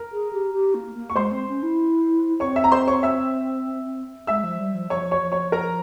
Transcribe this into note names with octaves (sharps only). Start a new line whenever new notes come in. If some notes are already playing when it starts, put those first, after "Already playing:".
Already playing: A#4
G#4
G4
G4
A#3
A#3
C#6
G#3 C5 C6
C4
C#4
E4
C4 C#5 C#6
E5 E6
A#5
C5 C6
C#5 C#6
E5 E6
G#3 E5 E6
F3
G3
F3
F3 C#5 C#6
C#5 C#6
F3
C#5 C#6
A#4 A#5